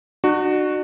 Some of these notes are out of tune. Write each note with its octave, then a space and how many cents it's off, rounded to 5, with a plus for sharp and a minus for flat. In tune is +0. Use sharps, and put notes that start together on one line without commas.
D4 +45 F#4 +0